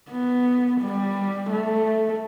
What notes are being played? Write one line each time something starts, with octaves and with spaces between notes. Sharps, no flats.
B3
G3
A3